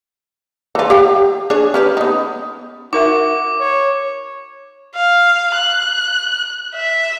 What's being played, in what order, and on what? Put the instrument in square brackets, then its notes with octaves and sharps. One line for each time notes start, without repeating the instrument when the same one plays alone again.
[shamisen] E3 F4
G4 F5 G5
D4 G#4 C#5
C#4 G4 B4
B3 D#4
[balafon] D#4 A#4 E5 [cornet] F#4 [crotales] D6
[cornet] C#5
[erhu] F5
F#6
E5